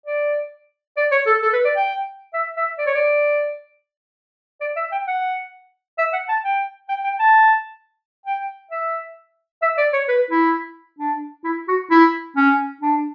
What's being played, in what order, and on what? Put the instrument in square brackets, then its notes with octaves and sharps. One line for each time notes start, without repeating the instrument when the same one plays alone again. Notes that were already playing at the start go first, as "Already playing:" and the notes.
[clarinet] D5
D5
C#5
A4
A4
B4
D5
G5
E5
E5
D5
C#5
D5
D5
E5
G5
F#5
E5
F#5
A5
G5
G5
G5
A5
G5
E5
E5
D5
C#5
B4
E4
D4
E4
F#4
E4
C#4
D4